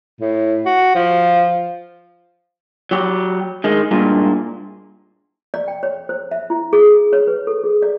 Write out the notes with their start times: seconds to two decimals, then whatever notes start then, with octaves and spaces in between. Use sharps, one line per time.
0.21 A2
0.66 F#4
0.95 F3
2.91 F#3 G4
3.64 D#3 G#3
3.91 G2 A#2 G#3
5.54 D5
5.68 G5
5.83 C#5
6.09 C5
6.31 E5
6.50 E4
6.73 G#4
7.13 C#5
7.27 B4
7.47 A4
7.64 G#4
7.82 D5